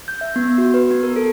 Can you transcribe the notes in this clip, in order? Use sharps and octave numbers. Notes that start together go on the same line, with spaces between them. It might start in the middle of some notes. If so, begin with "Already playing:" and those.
G6
E5
B3
F#4
B4
B3
A#4
A4